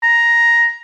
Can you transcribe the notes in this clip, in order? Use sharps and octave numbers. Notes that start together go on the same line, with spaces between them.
A#5